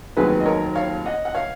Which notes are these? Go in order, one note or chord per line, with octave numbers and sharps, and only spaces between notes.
F1 D#2 D#3 F#3 G#4 B4
D#5
A#4 C#5
C#5 F5
D#5 F#5
F#5
C#5 F5